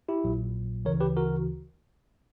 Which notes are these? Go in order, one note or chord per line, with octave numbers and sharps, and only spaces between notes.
E4 G4
A#1 A#2 F#3
D2 C#3 E3 A#4 C#5
G4 B4
F#4 A#4